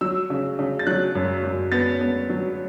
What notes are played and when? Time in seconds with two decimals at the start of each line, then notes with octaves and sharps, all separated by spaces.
0.01 F#3 E6
0.30 C#3
0.59 C#3
0.79 A6
0.87 F#3 F#6
1.15 F#2
1.43 F#2
1.72 B3 A6
2.01 B3
2.30 F#3